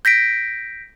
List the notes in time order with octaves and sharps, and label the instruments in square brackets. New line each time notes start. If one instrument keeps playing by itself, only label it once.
[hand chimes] G6 A#6 B6 D7